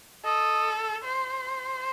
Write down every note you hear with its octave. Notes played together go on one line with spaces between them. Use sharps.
A4 D#5
C5